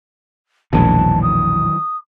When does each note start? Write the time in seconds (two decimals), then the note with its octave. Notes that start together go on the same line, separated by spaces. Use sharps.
0.73 E1 A#1 D#3 E3 F#3 A5
1.22 D#6